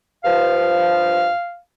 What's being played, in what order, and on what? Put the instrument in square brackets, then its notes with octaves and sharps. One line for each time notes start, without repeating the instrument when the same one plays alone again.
[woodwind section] G2 F3 [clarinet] F5